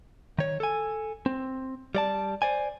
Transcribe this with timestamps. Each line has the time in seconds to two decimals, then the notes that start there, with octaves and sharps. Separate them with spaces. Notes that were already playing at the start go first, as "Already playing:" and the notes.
0.39 D#3 C#5
0.60 A4 G#5
1.26 C4
1.95 G3 D5 A5
2.42 C5 D5 G#5